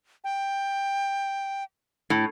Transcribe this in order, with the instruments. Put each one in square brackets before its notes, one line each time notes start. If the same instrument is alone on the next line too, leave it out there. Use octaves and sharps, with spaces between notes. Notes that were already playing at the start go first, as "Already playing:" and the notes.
[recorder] G5
[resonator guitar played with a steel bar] A2